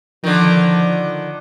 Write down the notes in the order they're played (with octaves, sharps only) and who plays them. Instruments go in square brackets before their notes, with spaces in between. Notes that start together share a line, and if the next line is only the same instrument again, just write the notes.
[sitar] D3 D#3 [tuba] F3